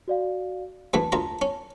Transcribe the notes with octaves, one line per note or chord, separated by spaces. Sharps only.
F#4 D5 F5
D2 E3 A3 A5
D2 F4 A#5
C#4